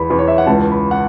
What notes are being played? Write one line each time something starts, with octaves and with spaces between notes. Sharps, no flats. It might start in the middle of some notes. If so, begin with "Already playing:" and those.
Already playing: E2 B5
E2
C#5
E5
F#5
C#2 A5
B5
F#5